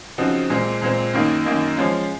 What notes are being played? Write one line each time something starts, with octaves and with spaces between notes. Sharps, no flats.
C#3 F3 C4 D#4 F#4
A#2 G#3 C4
A#2 G#3 C4
F#2 D#3 A#3 D#4
F#2 D#3 A#3 D#4
F3 G#3 C#4 F4